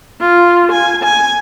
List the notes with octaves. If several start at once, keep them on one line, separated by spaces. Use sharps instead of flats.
F4
G#5
G#5